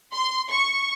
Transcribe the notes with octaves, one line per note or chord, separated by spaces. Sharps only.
C6
C#6